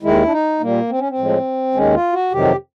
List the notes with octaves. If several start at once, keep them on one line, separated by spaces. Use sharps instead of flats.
D#2 D#3 G#3 E4
D4
D#4
A#2 G3 A#3
C4
C#4
C4
A2 F3 G#3
D#2 D#3 G#3 C#4
F4
F#4
F2 C3 D#3 F#3 G4